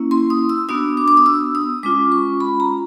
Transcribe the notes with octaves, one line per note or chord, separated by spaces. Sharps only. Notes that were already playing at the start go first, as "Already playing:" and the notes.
Already playing: A#3 C#4 E4
C6
D#6
E6
B3 D4 F#4 D#6
D6
D6
D#6
E6
D#6
G#3 C#4 F4 D6
C#6
B5
A#5